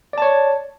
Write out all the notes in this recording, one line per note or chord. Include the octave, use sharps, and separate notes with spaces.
C#5 D5 A5